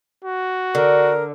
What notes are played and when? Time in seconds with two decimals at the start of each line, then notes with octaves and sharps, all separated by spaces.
0.24 F#4
0.75 D3 A#4